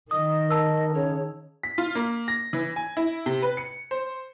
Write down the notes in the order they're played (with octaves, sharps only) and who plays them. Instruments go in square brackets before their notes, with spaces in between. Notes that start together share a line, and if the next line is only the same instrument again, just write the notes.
[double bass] D#3 [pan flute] D#5 [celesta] D#6
[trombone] A#4 [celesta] A5 E6
[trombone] C#3 [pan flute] C#5
[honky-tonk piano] B6
F4
A#3
A#6
E3
G#5
E4
C3
B4
C#7
C5